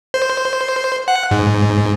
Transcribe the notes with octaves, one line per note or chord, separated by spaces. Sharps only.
C5
F#5
G#2